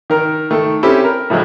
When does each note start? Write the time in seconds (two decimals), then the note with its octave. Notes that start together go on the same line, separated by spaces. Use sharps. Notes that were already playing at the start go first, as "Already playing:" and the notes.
0.10 D#3 A#4
0.51 D#3 A3
0.83 C4 C#4 E4 G4 A4
1.04 A#4
1.30 A2 F3 F#3 G#3